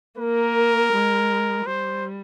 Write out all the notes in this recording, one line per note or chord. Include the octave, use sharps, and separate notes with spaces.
A#3 A#4
G#3
G3 C5